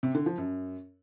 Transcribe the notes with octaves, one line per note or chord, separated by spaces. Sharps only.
C3
D3
F3
F#2